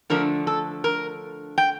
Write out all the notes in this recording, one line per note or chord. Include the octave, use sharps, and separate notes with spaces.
D3 F3 A3 D4 A#4
A4
A#4
G5